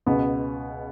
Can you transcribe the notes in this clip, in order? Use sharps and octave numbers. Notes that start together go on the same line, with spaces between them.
C#2 B2 B3